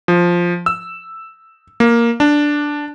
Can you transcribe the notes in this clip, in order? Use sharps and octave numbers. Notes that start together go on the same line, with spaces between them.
F3
E6
A#3
D4